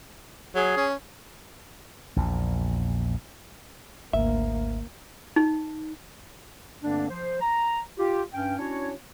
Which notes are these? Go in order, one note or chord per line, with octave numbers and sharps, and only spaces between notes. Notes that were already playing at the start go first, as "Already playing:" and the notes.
F#3 G#4
C#4
A#1 E2 A#2
G#1 D2 A#3 E5
D#4
G2 D3 A3 A#3 C4 D4
F3 C5
A#5
F4 G4
G2 C#4 G5
C#4 D4 E4 F#4 C#5